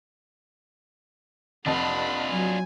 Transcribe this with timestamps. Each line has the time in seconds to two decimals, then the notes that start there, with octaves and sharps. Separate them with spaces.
1.66 F1 D4 F4 D#5 F#5 A5 B5
2.32 F#3 G#5